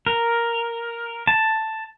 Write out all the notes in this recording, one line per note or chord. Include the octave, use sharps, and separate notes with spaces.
A#4
A5